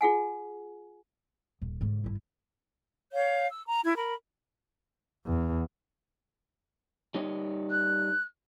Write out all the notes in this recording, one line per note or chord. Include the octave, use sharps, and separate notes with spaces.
F4 G#4 F#5 G#5
D#1
G#2 D3
G1 E4
C#5 F5 G6
E6
A#5
E4 G#6
A#4 B5
E2
G3 D#4 C#5
F#6